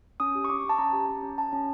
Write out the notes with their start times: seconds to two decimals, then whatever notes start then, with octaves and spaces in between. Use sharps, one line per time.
0.20 C#4 D#6
0.35 G4
0.44 C#6
0.50 C#4 D6
0.64 C#4
0.69 A5
0.78 C#4 A#5
0.93 G4
1.09 C#4
1.23 C#4
1.37 C#4 A5
1.53 C#4